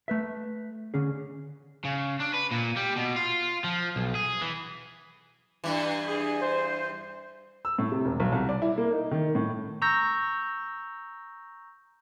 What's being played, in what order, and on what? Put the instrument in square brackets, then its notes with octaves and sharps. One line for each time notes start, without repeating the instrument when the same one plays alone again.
[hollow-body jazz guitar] A3 B4 E5
D3 C#4 G#4
[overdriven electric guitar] C#3
D4
B4
A#2
G3
B2
F4
F3
B1
G#4
E3
[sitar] G2 E3
[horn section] G#4
C5
[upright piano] E6
A2
C3
E1
B1
C2
D5
E4
A#3
D#4
D#3
A2
[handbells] A#5 C#6 E6 G6 A#6